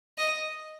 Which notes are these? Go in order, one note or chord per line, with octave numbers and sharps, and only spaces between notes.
D#5